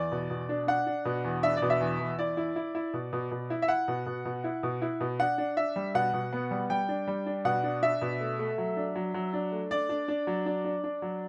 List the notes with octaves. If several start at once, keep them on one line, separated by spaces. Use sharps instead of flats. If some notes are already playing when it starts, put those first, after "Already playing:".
Already playing: E2 D5
B2
B2
D4
D4 F#5
D4
B2
E2
D4 E5
D5
B2
E5
E2
E2
E4 D5
E4
E4
E4
B2
B2
B2
E4
E5
E4 F#5
B2
B2
B2
E4
B2
E4
B2
D4 F#5
D4
D4 E5
G3
B2 F#5
B2
B3
G3
G3 G5
D4
G3
D4
B2 F#5
D4
D4 E5
B2
A3
A3
F#3
D4
F#3
F#3
D4
A3
D4 D5
D4
D4
F#3
D4
D4
D4
F#3